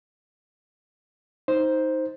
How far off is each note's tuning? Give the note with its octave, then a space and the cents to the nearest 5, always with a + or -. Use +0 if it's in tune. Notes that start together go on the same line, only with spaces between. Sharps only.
D#4 +15 C5 +0